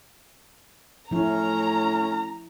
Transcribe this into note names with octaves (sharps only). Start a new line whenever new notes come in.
A2 F3 C#4 E4 A#5